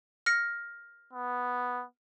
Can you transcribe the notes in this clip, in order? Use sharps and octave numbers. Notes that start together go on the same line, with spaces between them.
F6 A#6 C#7
B3